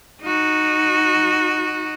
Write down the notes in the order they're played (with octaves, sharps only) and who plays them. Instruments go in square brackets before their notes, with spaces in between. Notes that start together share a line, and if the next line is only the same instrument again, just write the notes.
[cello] D#4 F#4